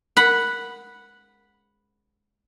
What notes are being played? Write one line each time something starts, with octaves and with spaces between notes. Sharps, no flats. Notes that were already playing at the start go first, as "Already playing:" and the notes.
F#5 B5